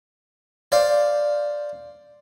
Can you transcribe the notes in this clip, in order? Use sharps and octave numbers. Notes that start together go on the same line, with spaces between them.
C5 D5 F5